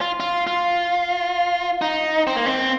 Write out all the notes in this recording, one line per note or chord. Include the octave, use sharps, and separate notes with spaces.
F4
F4
F4
D#4
C4
A#3
C4